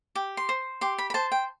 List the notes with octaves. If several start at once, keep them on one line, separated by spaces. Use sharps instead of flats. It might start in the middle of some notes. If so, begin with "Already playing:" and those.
G4
C6
C5
G4 C6
B5
B5
C5 A5
G5